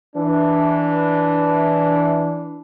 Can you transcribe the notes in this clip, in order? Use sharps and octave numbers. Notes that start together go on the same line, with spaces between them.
E3 D4